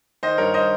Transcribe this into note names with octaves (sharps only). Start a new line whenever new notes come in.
D#3 C5 D#5
G2 A#4 C#5
C5 D#5